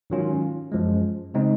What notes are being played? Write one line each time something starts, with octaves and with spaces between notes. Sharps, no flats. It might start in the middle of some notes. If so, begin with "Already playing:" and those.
G#2 D#3 F#3 C#4 F4
F#2 F3 G#3
C#3 G#3 C4 D#4